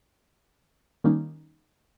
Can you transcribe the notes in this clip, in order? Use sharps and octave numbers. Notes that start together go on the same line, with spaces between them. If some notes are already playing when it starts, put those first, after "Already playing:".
D#3 G3 A#3 C#4 D#4